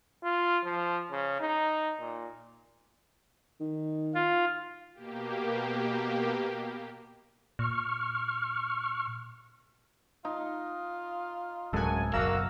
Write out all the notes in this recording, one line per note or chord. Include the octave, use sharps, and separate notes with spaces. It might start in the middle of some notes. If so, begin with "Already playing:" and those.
F4
F3
C#3
D#4
A#2
D#3
F4
B2 A#3 G4
A#2 C#6 F6
D#4 F4
D1 F#2 G#3 A4 F#5 G#5
F#1 B1 A#3 F#4 A#5 E6